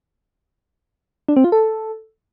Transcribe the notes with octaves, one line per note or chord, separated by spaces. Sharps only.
D4
C4
F4
A4